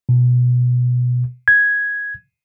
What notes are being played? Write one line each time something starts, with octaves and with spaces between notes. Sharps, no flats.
B2
G#6